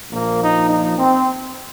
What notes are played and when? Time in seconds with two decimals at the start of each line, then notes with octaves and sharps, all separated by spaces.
0.12 A#1 A#2 F3 A#3
0.41 D#4
0.69 D#4
0.98 C4